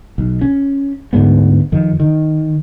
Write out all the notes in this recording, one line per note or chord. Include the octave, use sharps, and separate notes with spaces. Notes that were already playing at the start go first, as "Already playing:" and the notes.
B1
C#4
D2 G#2 G#3 B3
F2 D#3
D#3